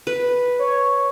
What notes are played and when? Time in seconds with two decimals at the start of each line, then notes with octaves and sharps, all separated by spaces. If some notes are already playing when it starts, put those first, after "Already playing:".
0.07 B4
0.59 C#5